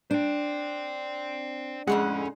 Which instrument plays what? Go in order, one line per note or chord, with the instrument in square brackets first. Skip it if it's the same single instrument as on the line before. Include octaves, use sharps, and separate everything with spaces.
[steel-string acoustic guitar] D4 [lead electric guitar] C5 G5
[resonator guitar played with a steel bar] F2 A2 F#5 [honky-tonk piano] G#3 [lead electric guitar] C#4